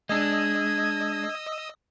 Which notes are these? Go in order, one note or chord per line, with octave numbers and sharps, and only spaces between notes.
G#3 D4 D#5 D#6 E6 G#6